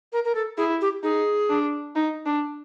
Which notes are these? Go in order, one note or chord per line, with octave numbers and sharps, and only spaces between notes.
A#4
A#4
A4
E4 G#4
G4
D#4 G#4
D4
D#4
D4